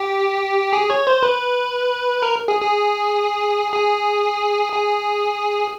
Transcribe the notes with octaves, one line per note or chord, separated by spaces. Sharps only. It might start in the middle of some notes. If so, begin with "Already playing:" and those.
Already playing: G4
G#4
C#5
C5
B4
A#4
G#4
G#4
G#4
G#4